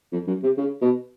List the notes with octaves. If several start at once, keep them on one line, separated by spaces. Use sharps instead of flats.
F2
F#2
C3
C#3
B2